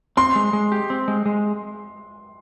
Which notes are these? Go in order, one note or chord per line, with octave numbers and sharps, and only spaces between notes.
C4 C6
G#3
G#3
G4
C4
G#3
G#3